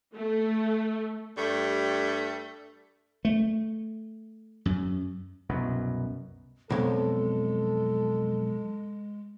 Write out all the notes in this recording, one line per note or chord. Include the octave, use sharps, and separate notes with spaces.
A3
G2 G3 A3
A3
F#2
C2 F#2 B2
B1 F2 G#3 A4